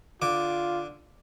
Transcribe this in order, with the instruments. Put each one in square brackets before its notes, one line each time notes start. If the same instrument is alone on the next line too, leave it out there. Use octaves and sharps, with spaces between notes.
[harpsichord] D3 D6 [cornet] F4